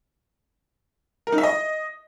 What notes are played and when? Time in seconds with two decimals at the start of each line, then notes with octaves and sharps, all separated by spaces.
1.27 A#4
1.32 D#4
1.38 E5
1.43 D#5